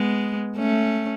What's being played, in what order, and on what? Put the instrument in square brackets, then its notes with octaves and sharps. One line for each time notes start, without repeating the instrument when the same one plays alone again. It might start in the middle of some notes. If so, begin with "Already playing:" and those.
Already playing: [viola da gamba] G#3 B3
A3 C#4